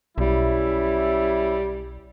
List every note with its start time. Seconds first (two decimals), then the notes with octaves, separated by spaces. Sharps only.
0.18 B1 G3 C#4 E4